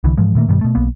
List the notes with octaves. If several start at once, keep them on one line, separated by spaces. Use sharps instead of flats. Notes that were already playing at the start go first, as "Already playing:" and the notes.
C2 D3 E3
G#2 E3 F3 G#3
A#2 D#3 A3 A#3
G2 B2 D#3 G3
B2 A3
B1 A#3 B3